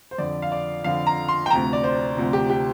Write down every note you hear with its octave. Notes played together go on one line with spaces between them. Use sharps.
C5
F2 D3 F3 D5
F5
D5
F2 D3 F3 F5
A#5
C6
G5
D2 C3 F3 A#5
D5
C5
D2 C3 F3
G4
G4